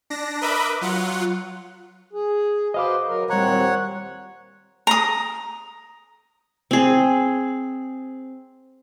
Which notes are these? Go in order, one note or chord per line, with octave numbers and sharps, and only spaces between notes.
D4 A#6
A#4 B4 D#5 E5 B5 D6
F#3 F4 F#5
G#4
F#4 B4 C5 D#5 F5 D6
F#3 A#4
D#2 A#2 G3 C4 C#5 F#5 A#5
A#5 D#6
C4 G#4